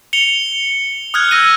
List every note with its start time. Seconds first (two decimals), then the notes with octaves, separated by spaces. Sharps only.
0.13 C#7 F7 G7
1.14 D#6 F6 F#6 G#6
1.31 E6 A#6 D#7